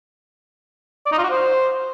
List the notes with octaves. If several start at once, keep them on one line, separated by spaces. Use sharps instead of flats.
D5
D#4
F4
F#4
C5